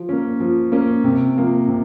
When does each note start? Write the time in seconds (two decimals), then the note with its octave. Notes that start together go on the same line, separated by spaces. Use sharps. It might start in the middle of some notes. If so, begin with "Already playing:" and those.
Already playing: F3
0.09 A#3 C#4
0.40 F3
0.72 A#3 C#4
1.04 C3
1.36 F3 A#3
1.68 C3